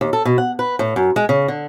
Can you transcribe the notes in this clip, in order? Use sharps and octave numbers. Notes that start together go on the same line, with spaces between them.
D#2
A4
B2
F#5
B4
A2
F#2
G#3
C#3
D3